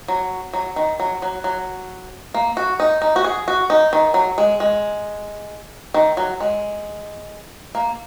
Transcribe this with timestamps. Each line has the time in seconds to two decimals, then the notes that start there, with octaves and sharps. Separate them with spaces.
0.08 F#3
0.53 F#3
0.76 D#3
1.00 F#3
1.22 F#3
1.44 F#3
2.34 A#3
2.57 F#4
2.80 D#4
3.02 D#4
3.16 F#4
3.24 G#4
3.48 F#4
3.70 D#4
3.93 D#3
4.14 F#3
4.38 G#3
4.60 G#3
5.94 D#3
6.17 F#3
6.40 G#3
7.75 A#3